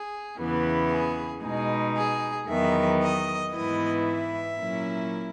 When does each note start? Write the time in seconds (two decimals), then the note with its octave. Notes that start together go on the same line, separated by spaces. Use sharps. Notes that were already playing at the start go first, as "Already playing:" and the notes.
Already playing: G#4
0.38 E2 C#3 E3 B3
0.91 G#4
1.43 B2 G#3 D#4 G#4
1.96 G#4
2.47 E2 D#3 F#3 B3 E5
3.01 D#5
3.52 G#2 E3 B3 E4 D#5
4.05 E5
4.57 A#2 F#3 C#4 E4